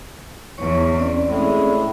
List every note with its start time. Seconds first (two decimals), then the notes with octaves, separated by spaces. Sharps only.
0.58 E2 C#5 C#6
0.97 C4 C#4 D5
1.28 A2 G#3